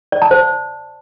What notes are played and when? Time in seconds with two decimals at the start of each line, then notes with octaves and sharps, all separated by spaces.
0.12 D5
0.22 A5
0.31 C5